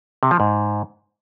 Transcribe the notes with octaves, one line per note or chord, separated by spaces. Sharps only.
C3
F3
G#2